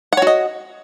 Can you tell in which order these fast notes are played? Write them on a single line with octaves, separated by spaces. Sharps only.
F#5 C#5 F#4 D#5